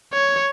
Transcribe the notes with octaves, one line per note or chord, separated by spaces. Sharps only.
C#5